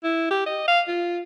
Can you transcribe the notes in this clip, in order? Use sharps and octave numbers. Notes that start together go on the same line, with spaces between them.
E4
G4
D#5
F5
F4